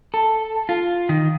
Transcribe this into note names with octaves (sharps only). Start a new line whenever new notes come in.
A4
F4
D#3